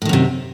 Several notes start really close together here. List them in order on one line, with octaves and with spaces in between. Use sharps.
A2 D#3 F#2 C3